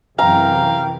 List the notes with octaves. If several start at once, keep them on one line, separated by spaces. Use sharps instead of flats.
F#2 C3 E3 F5 G5 A#5